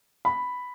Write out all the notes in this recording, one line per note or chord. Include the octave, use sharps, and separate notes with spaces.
B5